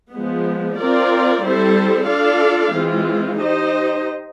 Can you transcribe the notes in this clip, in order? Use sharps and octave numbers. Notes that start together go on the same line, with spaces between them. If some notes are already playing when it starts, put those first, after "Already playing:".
F3 G#3 B3
C4 F4 A#4 D5
G3 C4 E4 A4 C5
D4 F4 A4 D5 F5
E3 G#3 C4 F4
D#4 G4 C5 D#5